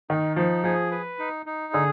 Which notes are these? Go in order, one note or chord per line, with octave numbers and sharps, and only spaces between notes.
D#3 D#4
F3 D#4
F3 G#4
B4
D#4
D#4
D3 G#4